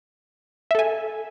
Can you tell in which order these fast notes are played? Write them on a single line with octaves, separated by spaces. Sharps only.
E5 A4 G#5